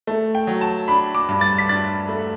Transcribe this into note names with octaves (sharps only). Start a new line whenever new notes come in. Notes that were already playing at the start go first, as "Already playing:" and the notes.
A3
G5
F#3
A5
D4 B5
D6
G2
A6
B6
D4 A6
A3